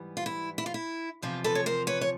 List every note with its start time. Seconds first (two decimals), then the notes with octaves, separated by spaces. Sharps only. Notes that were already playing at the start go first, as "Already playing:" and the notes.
Already playing: G#2 E3 G3 B3
0.17 F4
0.26 E4
0.58 E4
0.66 F4
0.74 E4
1.22 E2 C3 F3 F4
1.44 A4 B4
1.55 C#5
1.66 A#4 C5
1.87 B4 C#5
2.01 C#5